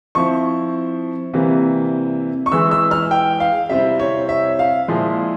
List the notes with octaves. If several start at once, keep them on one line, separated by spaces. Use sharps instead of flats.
F3 C4 E4 C#6
C3 E3 G3 A#3
C#6
E3 G#3 E4 E6
E6
F6
G5
F5
C3 G3 C4 E4 E5
C#5
E5
F5
A#2 F3 G#3 E4